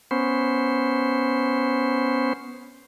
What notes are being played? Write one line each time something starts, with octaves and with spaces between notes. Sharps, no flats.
B3 C#4 C5